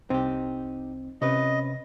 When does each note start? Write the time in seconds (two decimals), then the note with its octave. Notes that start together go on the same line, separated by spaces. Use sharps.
0.10 C2 C4 D#4 G4
1.22 C3 C#4 B4 D#5